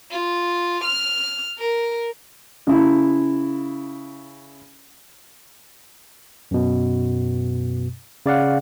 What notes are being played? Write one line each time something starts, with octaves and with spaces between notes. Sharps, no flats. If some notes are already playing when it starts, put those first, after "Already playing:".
F4
F6
A#4
C#3 E4
F#2 B2
C#3 D5 F5 F#5